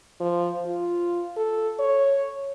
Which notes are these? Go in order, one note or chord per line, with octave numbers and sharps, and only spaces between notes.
F3
F4
A4
C#5